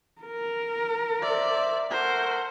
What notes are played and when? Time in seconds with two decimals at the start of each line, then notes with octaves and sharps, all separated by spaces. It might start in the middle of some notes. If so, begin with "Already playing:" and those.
0.21 A#4
1.22 C5 D5 E5
1.91 A3 A#4 C5 F#5